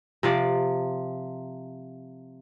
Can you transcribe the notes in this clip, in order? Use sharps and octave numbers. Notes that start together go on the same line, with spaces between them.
C3 F3 D5